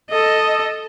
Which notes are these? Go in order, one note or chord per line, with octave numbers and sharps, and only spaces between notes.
A4 D#5